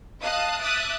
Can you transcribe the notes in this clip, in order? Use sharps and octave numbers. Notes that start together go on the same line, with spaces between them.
D#5 F5 A5 D#6 F#6
E5 D6 D#6 F#6 A6